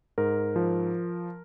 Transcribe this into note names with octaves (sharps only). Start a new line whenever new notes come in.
G#2 A#4
F3